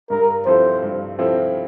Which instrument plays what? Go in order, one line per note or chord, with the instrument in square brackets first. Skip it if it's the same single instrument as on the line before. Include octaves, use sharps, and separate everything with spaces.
[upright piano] G2 [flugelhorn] A#4
[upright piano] F3 C4 E4 A4 [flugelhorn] C5
[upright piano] G2
F3 C4 E4 A4